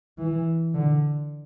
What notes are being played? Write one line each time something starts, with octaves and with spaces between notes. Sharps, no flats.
E3
D3